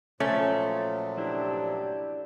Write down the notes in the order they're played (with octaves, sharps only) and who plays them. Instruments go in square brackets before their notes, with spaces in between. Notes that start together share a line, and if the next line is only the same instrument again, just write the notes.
[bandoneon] A#2 F3 F#3 [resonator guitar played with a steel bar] A3 [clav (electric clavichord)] C#4
[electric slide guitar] D4 E4 G4